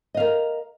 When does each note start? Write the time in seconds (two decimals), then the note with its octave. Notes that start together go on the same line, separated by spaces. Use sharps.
0.14 D#5
0.17 F5
0.20 A#4